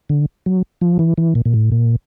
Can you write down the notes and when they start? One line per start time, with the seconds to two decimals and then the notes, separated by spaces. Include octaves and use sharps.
0.10 D3
0.46 F#3
0.81 F3
0.99 E3
1.18 E3
1.35 A#2
1.45 A#2
1.54 A2
1.72 A#2